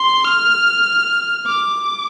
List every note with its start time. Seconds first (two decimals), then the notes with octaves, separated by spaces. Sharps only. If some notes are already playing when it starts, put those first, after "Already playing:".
Already playing: C6
0.25 F6
1.46 D6